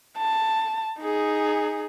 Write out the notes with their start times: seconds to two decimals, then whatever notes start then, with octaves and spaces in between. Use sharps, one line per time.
0.18 A5
1.01 D#4 G#4